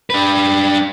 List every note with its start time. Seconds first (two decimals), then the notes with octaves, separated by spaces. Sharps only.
0.10 D4 B4